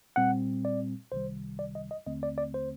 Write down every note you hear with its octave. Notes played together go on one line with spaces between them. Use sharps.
A#2 G3 C4 F#5
D5
C2 C3 D#3 G3 C5
D5
D#5
D#5
D#2 D3 A3 C4 D#5
D5
D5
C5